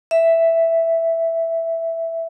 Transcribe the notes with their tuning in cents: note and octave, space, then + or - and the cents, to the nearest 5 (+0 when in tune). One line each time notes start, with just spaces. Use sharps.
E5 +5